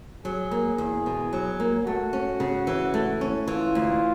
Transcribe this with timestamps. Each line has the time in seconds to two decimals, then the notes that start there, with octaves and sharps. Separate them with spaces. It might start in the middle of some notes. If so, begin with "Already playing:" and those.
0.25 F#3 G#4
0.51 A#3
0.78 E2
1.06 B2
1.33 F#3
1.60 A#3
1.86 A3 F#4
2.13 C#4
2.40 C#3
2.67 E3
2.94 A3
3.21 C#4
3.48 E3 F4
3.75 D2